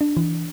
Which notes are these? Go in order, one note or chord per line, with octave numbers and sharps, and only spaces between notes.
D4
E3